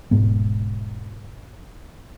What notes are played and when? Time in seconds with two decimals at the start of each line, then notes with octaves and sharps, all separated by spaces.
0.11 E1 G#2 B3